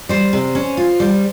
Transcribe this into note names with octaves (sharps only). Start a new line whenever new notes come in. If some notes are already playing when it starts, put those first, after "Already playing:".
G3 C5
C3
C#4
F4
G3